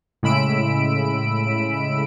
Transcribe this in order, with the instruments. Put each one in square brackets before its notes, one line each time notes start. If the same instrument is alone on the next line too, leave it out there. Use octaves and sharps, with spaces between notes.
[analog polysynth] A2 C#3 G#3 B5 E6 D7